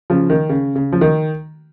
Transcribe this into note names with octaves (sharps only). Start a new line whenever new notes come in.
C#3 F3
D#3
C#3
C#3
F3
D#3